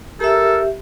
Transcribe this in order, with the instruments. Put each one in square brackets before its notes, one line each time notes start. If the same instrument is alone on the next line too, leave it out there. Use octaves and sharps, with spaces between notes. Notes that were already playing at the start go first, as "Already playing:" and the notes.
[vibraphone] G4 E5 [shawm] A4 [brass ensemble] A#4